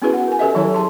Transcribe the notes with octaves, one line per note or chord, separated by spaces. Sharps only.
B3 C#4 E4 F#4 G#4 B4
F#5
A#4 G#5
C#4 G4 A4 B4 D#5 E5
D#3 F#3 E4 G4 A4 C#5
G#4 A5 C6